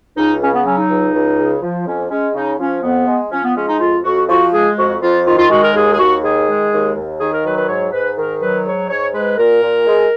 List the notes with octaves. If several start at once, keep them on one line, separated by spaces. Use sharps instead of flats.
C#2 D#4
C#3 C#4
B3
F#3 C#4
D#4
C#2
C#2
C#3
F3
F2 C#4
G#3 C#4
C#3 D#4
F3 C#4
F2 B3
G#3
F3 C#4
B3
G#3 C#4
D#4
F2 F4
F2 F#4
F3 F#4
G#3 G#4
F2 F#4
F2 F4
D#3 F4
F4
G#3 F#4
A#4
D#2 G#4
G#4
D#2 F#4
D#3 G#4
G#3
D#2
D#2
D#3 G#4
A#4
F#3 B4
B4
G#2 C#5
G#2 B4
D#3 A#4
F#3 B4
G#2 C#5
G#2 C#5
G#3 B4
A#2 A#4
A#2
G#3